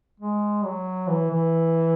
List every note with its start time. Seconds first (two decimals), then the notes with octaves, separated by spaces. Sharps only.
0.20 G#3
0.64 F#3
1.08 E3
1.30 E3